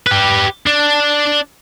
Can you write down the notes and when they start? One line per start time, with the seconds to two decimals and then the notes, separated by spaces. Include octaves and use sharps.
0.07 G4 B4
0.66 D4